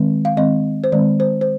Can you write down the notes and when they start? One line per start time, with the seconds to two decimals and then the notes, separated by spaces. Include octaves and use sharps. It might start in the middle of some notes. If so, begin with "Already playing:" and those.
Already playing: D#3 G#3 C4
0.25 F5
0.37 D#3 G#3 C4 D#5
0.84 C5
0.92 D#3 G#3 C4 D5
1.20 C5
1.41 C5